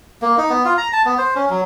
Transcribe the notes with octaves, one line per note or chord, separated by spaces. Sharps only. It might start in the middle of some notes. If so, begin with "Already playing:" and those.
A#3
D#4
B3
F4
A#5
A5
B3
C5
C#4
F#3